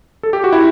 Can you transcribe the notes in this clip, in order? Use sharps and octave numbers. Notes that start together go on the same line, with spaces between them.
A4
G4
F#4
E4